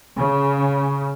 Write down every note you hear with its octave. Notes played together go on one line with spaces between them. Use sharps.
C#3